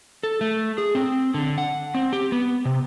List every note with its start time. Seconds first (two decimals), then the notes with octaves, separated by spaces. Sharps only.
0.23 A4
0.41 A3
0.78 G#4
0.95 C4
1.34 D3
1.58 F#5
1.95 C4
2.13 G4
2.32 B3
2.65 C3